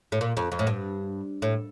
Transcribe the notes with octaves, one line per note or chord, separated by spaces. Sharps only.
A2
A#2
F2
F2
A2
G2
A2